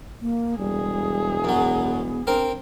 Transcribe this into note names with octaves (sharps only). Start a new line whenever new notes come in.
A#3
E1 G3 G#4
F#2 F#3 B3
C4 D4 A#4